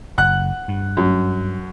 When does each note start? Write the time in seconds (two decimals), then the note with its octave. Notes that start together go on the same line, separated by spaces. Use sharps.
0.18 F#1 F#5 F#6
0.68 G2
0.97 F#2